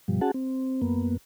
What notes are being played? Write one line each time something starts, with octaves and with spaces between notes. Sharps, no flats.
G2 B2 F3 G3
C#4 F#4 G#4 F#5 A5
C4
F#2 A#3 B3